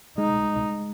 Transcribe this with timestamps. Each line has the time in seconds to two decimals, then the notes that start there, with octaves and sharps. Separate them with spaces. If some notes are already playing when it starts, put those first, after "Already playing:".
0.18 G#3 D#4